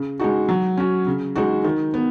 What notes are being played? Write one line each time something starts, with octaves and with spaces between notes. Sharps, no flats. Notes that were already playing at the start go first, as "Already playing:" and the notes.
Already playing: C#3
G#3 D#4 F#4
F#3
C#4 F#4
C#3
G#3 D#4 F#4
D#3
B3